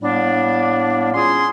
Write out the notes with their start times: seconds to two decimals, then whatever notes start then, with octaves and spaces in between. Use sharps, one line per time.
0.01 A2 G3 A#3 B3 D4
1.14 C#4 F4 G#4 C6